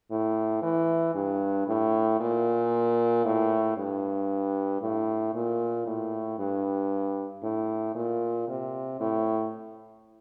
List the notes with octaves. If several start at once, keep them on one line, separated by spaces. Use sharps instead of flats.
A2
E3
G2
A2
A#2
A2
G2
A2
A#2
A2
G2
A2
A#2
C3
A2